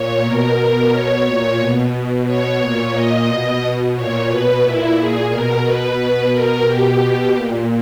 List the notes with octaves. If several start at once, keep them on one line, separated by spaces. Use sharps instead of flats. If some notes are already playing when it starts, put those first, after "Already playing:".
Already playing: A#2 C#5
B2 A#4
B2 A#4
B2 C#5
A#2
B2
B2
B2 C#5
A#2
A#2 D#5
B2
B2
A#2 C#5
B2 B4
A#2 E4
A#2 G#4
B2 A#4
B2 B4
B2 B4
B2 A#4
B2 G4
B2
A#2